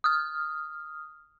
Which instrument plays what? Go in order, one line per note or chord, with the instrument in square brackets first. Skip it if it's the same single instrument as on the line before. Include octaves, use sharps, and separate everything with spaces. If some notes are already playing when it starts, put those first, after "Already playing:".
[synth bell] D#6 F6